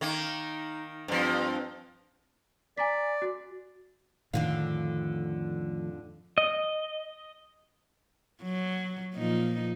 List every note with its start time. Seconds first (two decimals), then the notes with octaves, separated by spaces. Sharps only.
0.01 D#3 A#3 D#4
1.08 G2 F3 C4
2.78 D5 G#5 A#5 B6
3.22 F#4
4.34 F2 A2 D3 D#3 F3 F5
6.38 D#5
8.42 F#3
9.14 A#2 F3 D#4